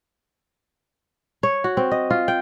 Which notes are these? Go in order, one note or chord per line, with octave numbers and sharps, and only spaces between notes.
C#5
F#4
C4
D#5
F4
G5